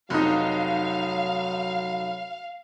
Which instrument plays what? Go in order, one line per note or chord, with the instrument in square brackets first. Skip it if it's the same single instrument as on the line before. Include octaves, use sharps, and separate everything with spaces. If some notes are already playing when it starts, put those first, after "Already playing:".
[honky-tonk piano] F1 D#4 [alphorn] F#3 [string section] F5